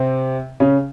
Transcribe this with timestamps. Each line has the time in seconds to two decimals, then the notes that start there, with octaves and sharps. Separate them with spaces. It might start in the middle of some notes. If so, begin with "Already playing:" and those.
Already playing: C3 C4
0.60 C#3 C#4